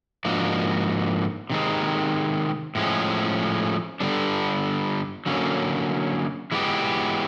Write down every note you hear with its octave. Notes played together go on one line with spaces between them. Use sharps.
G#2 F3 A#3 D4 F#4
C3 D#3 G#3 C4
A2 F3 G#3 C#4
G2 D3 G3 B3 D4
D3 F#3 A#3 C#4
E3 G#3 B3 E4 G4